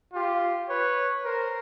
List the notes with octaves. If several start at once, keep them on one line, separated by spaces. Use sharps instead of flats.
F4 G4
B4 C#5
A#4 C5